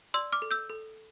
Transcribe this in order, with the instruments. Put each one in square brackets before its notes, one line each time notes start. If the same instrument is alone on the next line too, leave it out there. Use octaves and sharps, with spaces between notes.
[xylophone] D5 C6 E6
D6 F6
A4
E6 G6
A4